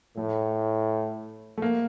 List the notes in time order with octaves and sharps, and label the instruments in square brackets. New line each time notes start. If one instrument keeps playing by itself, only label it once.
[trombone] A2 [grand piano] A3
[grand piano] A3
A#3